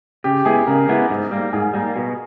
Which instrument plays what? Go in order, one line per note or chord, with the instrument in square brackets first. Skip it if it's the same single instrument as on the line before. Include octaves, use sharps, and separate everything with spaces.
[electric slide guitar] C#3 [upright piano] G4
[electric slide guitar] G#3 B3 E4 [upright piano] G#4
[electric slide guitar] C#3 [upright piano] A#4
[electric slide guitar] G#3 B3 E4
G#2
G3 A#3
[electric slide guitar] G#2 [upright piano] G#4
[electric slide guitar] G3 A#3
B2